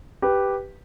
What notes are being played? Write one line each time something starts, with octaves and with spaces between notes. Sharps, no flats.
G4 B4